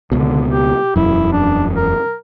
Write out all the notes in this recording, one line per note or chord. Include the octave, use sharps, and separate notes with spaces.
C#2 B2 D3
G4
E1 F#2 E4
D4
A#4